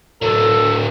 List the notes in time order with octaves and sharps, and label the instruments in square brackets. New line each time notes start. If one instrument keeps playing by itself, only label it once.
[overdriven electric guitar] D3 F#3 [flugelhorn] A4